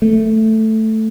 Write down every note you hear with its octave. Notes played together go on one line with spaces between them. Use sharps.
A3